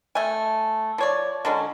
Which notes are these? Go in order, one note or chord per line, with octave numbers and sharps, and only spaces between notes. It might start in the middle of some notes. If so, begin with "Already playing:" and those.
A3 G#5
F3 C#5 D5
D3 F#3 G#3 C#4